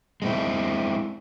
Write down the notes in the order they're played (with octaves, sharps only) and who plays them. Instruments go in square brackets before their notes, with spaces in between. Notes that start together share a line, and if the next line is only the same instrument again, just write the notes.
[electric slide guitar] G#3 C4 E4